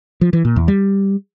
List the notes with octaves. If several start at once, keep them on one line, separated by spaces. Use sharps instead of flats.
F3
E3
A#2
E2
G3